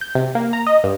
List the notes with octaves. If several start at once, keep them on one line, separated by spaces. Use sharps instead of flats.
G6
C3
A#3
A#5
D#5
G2